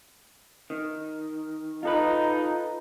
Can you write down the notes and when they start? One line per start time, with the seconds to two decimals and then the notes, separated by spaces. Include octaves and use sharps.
0.70 D#3
1.83 D#4 F4 A4 B4